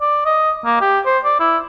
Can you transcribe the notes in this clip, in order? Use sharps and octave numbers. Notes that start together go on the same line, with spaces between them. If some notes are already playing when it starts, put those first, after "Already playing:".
D5
D#5
A#3
G4
C5
D5
E4